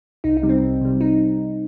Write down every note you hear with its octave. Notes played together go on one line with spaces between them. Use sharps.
C2 D#4
D#4
C3 G3
C4
C2
C3 G3
D#4